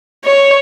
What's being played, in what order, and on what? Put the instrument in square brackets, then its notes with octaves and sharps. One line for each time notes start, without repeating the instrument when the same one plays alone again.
[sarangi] C#5